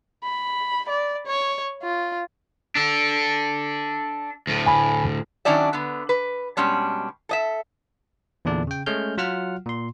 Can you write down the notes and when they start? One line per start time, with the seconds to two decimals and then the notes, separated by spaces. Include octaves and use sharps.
0.24 B5
0.89 D5
1.27 C#5
1.83 F4
2.75 D4 A4
4.47 D2 A2
4.66 G#5 B5
5.45 D#3 F#3 C#4 D4 D5 E5
5.73 D3 B3
6.09 B4
6.57 B2 G3 G#3 C#4 D4
7.29 A4 D#5 E5
8.45 E2 A#2 D3 D4 D5
8.67 C#3 G5
8.86 G#3 A3 C#4 F6 G6
9.18 F#3 F4 F#5 F6
9.66 A#2 C6